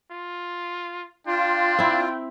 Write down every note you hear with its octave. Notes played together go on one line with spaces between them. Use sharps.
F4
D4 F4 G5
C4 E4